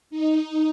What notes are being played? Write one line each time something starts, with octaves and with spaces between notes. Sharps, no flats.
D#4